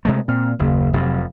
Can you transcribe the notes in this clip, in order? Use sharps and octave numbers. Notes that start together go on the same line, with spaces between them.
C3 G#3 A3
A#2 C4 F6
F#1 D#2 C#3 A#3
F1 F2 C3 F#3